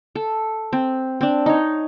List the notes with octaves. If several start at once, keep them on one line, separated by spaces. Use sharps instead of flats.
A4
C4
C4 D4
D#4 C#5